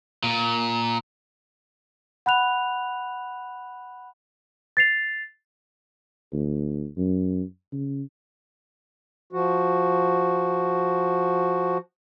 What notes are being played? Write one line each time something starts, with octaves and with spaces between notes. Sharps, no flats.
A#2
F#5 B5 F#6 F7
A6 C7 F7
D2
F#2
C#3
F3 F#4